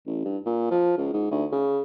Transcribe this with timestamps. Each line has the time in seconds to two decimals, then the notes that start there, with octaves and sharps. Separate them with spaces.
0.06 A1
0.25 G2
0.46 A#2
0.71 F3
0.97 C#2
1.13 G#2
1.31 D2
1.52 C#3